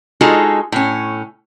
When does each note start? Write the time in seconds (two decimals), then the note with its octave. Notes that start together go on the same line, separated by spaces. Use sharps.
0.21 G#3 D#4 F4 F#4 G#4 A4
0.72 A2 C#4